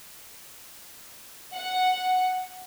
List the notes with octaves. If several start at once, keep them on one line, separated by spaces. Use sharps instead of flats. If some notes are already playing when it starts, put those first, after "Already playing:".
F#5